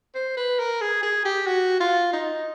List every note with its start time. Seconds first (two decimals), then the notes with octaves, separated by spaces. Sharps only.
0.15 C5
0.37 B4
0.59 A#4
0.81 G#4
1.03 G#4
1.25 G4
1.47 F#4
1.80 F4
2.13 D#4